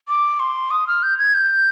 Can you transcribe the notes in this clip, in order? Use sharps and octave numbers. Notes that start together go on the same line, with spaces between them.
D6
C6
D#6
F6
G6
G#6
G6